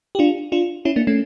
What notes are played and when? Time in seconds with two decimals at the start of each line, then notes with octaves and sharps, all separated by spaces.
0.15 G4
0.19 D4 F4
0.52 D4 F4
0.85 C#4 E4
0.96 A#3 D4
1.07 A3 C#4